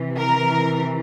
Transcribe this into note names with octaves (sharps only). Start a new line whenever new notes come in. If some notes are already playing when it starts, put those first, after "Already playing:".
Already playing: C3 E3
A#4